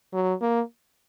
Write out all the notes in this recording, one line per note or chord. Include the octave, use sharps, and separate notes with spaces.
F#3
A#3